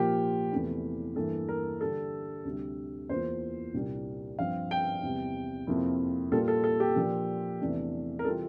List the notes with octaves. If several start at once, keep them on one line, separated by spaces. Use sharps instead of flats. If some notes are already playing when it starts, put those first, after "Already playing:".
Already playing: A#2 F3 A#3 F4 G4
E2 C3 E3 A3 E4
G2 E3 A#3 A4
A#4
D3 G3 D4 A4
D2 C3 G3
E2 E3 A#3 F4 C5
C2 A#2 G3 A#3 D4
G2 F3 C4 F5
G5
E2 C3 G3
F2 C3 F3 A#3 E4
A#2 G3 A#3 F4 A4
A4
A4
G4
A#2 F3 A#3 D4
E2 C3 E3 A3 D4
A#4
C3 E3 G3 C4 F4 A4